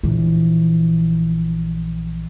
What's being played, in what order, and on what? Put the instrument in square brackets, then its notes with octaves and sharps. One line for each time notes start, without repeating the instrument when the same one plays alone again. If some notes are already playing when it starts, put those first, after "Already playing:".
[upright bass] A#1 E3